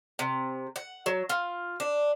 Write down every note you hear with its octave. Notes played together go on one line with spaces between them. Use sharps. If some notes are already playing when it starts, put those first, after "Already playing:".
C3
F#5
F#3
F4
D4